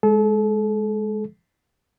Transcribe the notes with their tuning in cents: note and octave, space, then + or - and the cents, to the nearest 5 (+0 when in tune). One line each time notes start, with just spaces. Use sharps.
G#3 +0 A4 -35